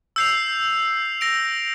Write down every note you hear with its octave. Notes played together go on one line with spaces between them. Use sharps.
E6 G6 C7 F7
E6 A#6 D7 F7